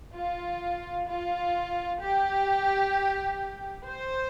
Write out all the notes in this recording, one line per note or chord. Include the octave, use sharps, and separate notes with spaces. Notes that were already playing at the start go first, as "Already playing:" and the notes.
F4
F4
G4
C5